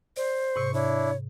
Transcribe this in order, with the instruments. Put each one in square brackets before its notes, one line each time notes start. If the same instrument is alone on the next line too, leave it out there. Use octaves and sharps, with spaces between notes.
[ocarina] C5 [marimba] D5
[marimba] G#2 C3 [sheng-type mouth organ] C#6
[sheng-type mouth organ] D4 E4 [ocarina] C#5